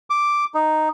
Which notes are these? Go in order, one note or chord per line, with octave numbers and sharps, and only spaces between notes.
D6
D#4